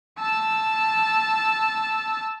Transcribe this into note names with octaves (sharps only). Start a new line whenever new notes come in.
A5 E6